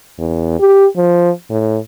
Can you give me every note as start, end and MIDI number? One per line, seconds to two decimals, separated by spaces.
0.19 0.56 40
0.60 0.86 67
0.97 1.30 53
1.50 1.77 45